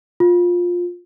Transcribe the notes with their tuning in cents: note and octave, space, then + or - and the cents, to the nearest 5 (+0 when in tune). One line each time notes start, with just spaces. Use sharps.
F4 +15